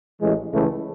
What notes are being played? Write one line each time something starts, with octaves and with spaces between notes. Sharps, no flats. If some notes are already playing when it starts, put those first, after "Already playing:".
A1 A2 E3 G#3
C#2 C#3 E3 A3